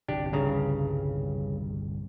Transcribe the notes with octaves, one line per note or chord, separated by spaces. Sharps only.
G1 C2 D4 G4
G2 C#3 A#5